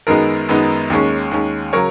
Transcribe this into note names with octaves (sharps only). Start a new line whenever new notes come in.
F#2 D#3 G#3 B3 D#4 A#4
F#2 D#3 G#3 B3 D#4
D#2 D#3 G#3 C#4
D#2 D#3 G#3 C#4
C#3 F#3 A#4 C#5